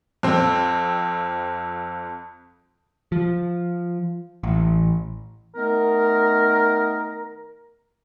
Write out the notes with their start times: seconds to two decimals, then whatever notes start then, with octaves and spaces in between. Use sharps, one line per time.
0.23 F2 C4
3.12 F3
4.43 A1
5.55 D#3 A3 B3 D#4 A#4